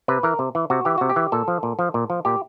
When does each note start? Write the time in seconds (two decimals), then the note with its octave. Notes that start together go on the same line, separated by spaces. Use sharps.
0.08 C3 B4
0.23 E3 A#4
0.39 C3
0.55 E3
0.70 C3 F#4
0.85 E3 G4
0.98 C3 F#4
1.09 G4
1.16 E3
1.32 A#2 A4
1.48 F3
1.63 A#2
1.79 F3
1.94 A#2
2.10 F3
2.25 A#2 G4